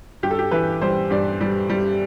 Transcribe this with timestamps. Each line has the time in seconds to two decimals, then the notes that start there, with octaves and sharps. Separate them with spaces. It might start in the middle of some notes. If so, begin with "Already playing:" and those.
0.23 G2 G4
0.31 A4
0.39 G4
0.51 E3 B4
0.82 G3 C5
1.11 G2 D5
1.41 G3
1.70 G3